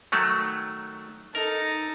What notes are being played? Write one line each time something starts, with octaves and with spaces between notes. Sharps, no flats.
D#3 F#3 A3
D#4 A4 A#4